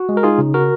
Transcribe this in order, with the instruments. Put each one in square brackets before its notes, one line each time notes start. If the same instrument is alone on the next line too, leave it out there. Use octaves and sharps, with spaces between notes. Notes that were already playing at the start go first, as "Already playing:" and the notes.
Already playing: [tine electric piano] F#4
G#3
A#4
D#4 F4 G#4
C#3
F#4 A#4